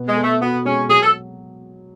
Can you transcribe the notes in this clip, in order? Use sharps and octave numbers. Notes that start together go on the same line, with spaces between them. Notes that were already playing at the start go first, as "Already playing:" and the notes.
Already playing: B2 B3
G#3
A4
A3
B3 F#4
G#3 C#4
F#3 G#4
A4